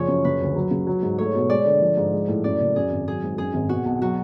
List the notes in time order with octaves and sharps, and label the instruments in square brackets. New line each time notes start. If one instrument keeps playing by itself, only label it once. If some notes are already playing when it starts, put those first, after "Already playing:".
Already playing: [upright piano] F#1 F3 [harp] F4 G#4 C#5
[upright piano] F#2
[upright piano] C#3 [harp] B4
[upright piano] D2
F#3
C#3
F#3
G#2
[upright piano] A3 [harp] C#5
[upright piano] B2
[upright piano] G#3 [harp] D5
[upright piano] D3
F3
G#2
G#3
A2
[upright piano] F#2 [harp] D5
[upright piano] F#1
[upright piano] F#2 [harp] G#4
[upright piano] G#1
[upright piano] F#3 [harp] G#4
[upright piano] G#2
[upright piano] F#2 [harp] G#4
[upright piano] G#1
[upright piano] B2 [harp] F#4
[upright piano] B1
[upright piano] F#3 [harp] F#4